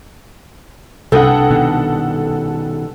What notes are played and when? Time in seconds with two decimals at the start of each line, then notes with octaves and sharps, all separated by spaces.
1.12 C2 G2 A4 F#5 G5 D#6
1.51 B2 D#3